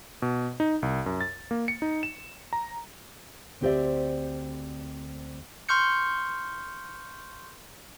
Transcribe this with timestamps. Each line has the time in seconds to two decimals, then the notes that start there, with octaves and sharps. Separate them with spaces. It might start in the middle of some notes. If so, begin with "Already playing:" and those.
0.22 B2
0.60 D#4
0.82 C2
1.06 F#2
1.21 A6
1.51 A#3
1.68 C#7
1.82 D#4
2.03 E7
2.53 A#5
3.61 D2 C4 G4 C5 D5 E5
5.69 C6 C#6 F6 G6 C#7